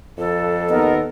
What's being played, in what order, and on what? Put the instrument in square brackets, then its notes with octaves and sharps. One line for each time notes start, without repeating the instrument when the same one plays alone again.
[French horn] F2 [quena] A4
[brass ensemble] D#2 B3 A#4 [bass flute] D#5